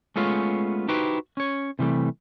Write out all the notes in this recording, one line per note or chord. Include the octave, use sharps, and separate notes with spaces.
G#3 A3 B3 C#4 F4 C#5
D#4 E4 F#4 G4 B4 C5
C#4 C#5
C3 E3 G3 A3